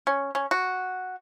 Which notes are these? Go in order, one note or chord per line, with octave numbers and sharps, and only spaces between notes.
C#4
C#4
F#4